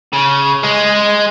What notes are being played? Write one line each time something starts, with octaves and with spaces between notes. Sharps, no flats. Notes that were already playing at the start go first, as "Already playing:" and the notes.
C#3
G#3 G#4